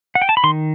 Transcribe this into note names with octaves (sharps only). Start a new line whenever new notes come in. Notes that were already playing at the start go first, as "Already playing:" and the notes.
F#5
G5
A5
B5
D#3 C6